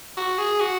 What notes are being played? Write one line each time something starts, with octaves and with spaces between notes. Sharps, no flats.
F#4
G#4
F#4